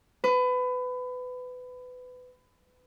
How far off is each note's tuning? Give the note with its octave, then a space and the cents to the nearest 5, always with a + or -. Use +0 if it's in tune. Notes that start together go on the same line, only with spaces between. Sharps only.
B4 +25